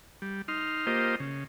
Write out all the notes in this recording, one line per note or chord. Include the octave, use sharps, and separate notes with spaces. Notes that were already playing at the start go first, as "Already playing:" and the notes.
G3
D#4 C6 F6
A#3 F4 G4 C5 D#5
C#3